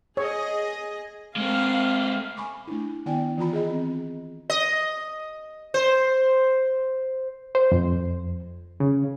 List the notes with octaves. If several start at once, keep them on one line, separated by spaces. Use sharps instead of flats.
G#4 C#5 D#5
G#3 A#3 C4 F5
G#5 B5 C#6 D6
A3 D4 E4
D#3 B3 E4 D5 G5 G#5
E3 F4 A#5 B5
G#4 D#5
C4
D#5
C5
C5
F2
C#3